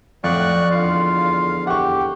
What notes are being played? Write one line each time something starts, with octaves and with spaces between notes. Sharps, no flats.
F2 A2 D5 F#5 C#6 F#6
E2 D3 F4 F5
G4 F#5 C#6